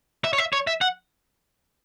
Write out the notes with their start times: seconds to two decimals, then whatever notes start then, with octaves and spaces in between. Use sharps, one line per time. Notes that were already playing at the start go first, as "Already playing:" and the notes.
0.24 E5
0.33 C#5
0.38 E5
0.53 C#5
0.67 E5
0.81 F#5